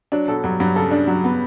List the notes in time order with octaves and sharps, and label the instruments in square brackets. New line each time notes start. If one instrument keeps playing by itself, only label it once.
[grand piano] F#3 [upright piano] D4
[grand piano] B2 [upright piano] A4
[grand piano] G2 [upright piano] F#3
[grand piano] G2 [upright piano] F#3
[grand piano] C#3 [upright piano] A4
[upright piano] D4
F#3
B3